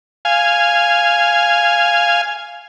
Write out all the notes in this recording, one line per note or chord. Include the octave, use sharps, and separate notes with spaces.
F5 G#5